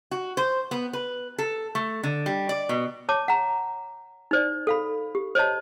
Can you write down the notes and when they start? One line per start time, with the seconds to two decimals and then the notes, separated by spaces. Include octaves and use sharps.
0.11 F#4
0.37 C5
0.71 B3
0.93 B4
1.38 A4
1.75 A3
2.03 D3
2.26 G3
2.49 D5
2.69 B2
3.09 C#5 A5 D6
3.28 F#5 A#5
4.31 D#4 C5 D5
4.67 A4 F5 B5
5.15 G4
5.35 C5 C#5 D#5 A5